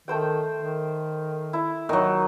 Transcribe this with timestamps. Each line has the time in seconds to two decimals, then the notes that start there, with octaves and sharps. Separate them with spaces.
0.08 D#3 A3 C5 G5
0.57 D#3
1.53 E4
1.89 D#3 F#3 D#4